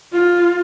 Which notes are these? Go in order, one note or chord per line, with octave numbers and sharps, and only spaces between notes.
F4